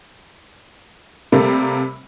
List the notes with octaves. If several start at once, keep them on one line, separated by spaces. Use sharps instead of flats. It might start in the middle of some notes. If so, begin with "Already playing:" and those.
C3 G3 A3 A#3